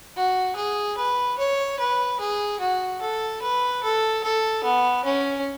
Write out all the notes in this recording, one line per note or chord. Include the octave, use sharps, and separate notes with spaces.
F#4
G#4
B4
C#5
B4
G#4
F#4
A4
B4
A4
A4
B3
C#4